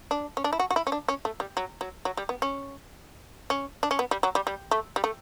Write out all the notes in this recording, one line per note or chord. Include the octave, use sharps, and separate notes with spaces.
D4
C#4
D4
E4
F#4
F#4
E4
C#4
D4
C#4
A3
G3
F#3
F#3
F#3
G3
B3
C#4
C#4
D4
C#4
B3
G3
F#3
G3
G3
A3
G3
A3